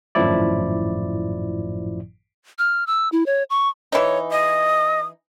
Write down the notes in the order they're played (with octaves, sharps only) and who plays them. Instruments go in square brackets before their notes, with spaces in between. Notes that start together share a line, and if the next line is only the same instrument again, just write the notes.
[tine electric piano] G#1 F#2 A2 F3 E4 D5
[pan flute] F6
E6
E4
C#5
C#6
[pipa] E3 D#4 [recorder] C#5
[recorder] D#5 [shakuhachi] D#6